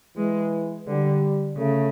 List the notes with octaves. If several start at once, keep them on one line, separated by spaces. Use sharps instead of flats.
E3 G#3
D3 G3
C#3 A3